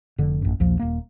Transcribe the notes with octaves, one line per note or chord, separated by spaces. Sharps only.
F1 D3
A1 F#2
A#1 D#2 F3 A#3
D#1 A#3